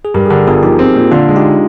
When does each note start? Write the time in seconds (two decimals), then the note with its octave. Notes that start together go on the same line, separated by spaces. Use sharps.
0.05 G#4
0.14 G2 G4 A#4
0.26 G#4
0.30 D3 G4 A#4
0.47 G1 F4 G#4
0.63 F3 D#4 G4
0.79 C4
0.95 A#2
1.11 D3 D4 F4
1.28 G#3
1.36 D#4 G4